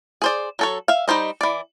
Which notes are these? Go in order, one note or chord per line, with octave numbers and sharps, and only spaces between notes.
G#4 C5 D5
F#3 A4 C#5
E5 F5
G3 D#4 C5 D#5
E3 D5